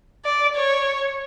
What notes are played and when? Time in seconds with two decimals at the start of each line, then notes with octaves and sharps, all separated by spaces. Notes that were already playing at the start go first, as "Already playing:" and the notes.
0.25 D5
0.56 C#5